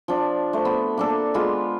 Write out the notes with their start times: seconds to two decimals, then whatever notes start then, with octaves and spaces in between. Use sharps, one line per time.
0.08 F3 D4
0.53 A3 C5
0.65 B3
0.97 A#3 D4 A4
1.34 G#3 B3 F4